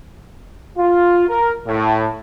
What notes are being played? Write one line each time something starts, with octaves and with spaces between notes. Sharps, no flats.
F4
A#4
A2